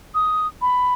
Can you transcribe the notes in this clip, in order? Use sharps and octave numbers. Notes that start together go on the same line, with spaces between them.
D#6
B5